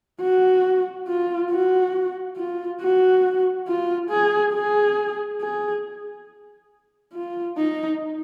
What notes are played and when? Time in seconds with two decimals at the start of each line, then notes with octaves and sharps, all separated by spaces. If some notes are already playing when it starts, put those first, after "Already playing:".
0.21 F#4
1.08 F4
1.51 F#4
2.37 F4
2.81 F#4
3.68 F4
4.10 G#4
4.54 G#4
5.41 G#4
7.13 F4
7.58 D#4